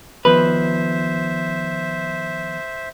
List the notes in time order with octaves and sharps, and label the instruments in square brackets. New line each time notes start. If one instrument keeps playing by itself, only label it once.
[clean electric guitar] D#3 F3 B3 [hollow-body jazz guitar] B4 [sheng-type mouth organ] C5 E5